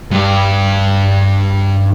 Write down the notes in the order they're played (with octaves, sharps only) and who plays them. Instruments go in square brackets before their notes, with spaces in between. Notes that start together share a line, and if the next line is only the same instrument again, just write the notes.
[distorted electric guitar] G2 G4